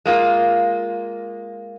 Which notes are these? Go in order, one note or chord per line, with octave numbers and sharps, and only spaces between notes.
G#3 A#3 F4